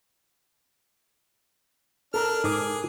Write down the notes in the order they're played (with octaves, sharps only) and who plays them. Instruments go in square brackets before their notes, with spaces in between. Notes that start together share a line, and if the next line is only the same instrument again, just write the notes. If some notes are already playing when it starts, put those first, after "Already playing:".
[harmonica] D4 F6 [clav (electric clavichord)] A4 A#4
[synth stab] G#2 D6 [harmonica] G#4